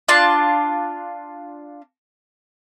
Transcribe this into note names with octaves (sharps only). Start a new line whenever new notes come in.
D4 F4 A5